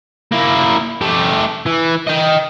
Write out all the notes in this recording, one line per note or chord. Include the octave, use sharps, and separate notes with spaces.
A#3 E4
A3 G4
E3
D#5 G5